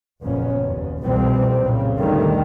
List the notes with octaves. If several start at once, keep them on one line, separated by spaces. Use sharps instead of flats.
F#1 F2 A#2 B3 C#4
D#2
C2 F2 B2 E3 G3 C4
F#2 A#2 C#3
D2 A#2 D#3 G3 A3